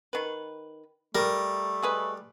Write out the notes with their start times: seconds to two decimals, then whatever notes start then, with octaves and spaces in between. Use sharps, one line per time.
0.13 D#3 B4
1.15 G3 A3 A#4
1.83 G#3 G#4 B4